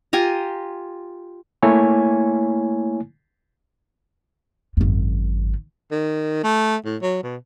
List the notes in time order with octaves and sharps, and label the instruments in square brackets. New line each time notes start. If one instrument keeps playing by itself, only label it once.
[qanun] F4 G4 G#5 A#5
[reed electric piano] A3 A#3 E4 C#5 G#5
[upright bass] G#1 F#2
[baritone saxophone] D#3
A3
A2
F#3
B2